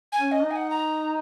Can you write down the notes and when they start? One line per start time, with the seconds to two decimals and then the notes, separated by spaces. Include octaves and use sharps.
0.12 G#5
0.19 C#4
0.32 D#5
0.44 D#4
0.51 G#5
0.56 F#5
0.70 A#5